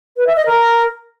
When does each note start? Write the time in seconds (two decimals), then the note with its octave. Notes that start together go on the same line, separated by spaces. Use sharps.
0.17 B4
0.27 E5
0.36 D#5
0.46 A#4